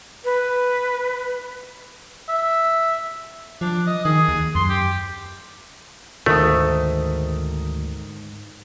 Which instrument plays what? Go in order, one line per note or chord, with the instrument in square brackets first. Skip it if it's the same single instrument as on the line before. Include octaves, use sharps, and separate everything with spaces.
[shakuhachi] B4
[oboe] E5
[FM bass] F3 [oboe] D4
[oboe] D#5
[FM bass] D#3 [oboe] G#4
[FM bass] D#2
[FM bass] F#2 [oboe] C6
[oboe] G4
[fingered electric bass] D2 D#3 [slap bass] G#2 [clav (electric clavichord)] A3 [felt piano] A#4 D#6